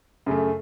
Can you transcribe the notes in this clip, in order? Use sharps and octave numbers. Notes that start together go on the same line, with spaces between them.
F#2 C#3 A3